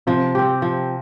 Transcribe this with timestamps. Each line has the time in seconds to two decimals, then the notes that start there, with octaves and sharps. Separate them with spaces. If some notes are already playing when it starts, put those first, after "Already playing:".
0.07 C3 F3
0.35 C4 G4
0.62 F3